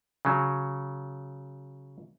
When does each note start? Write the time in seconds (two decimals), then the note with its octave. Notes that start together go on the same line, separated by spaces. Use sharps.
0.25 C#3 F#3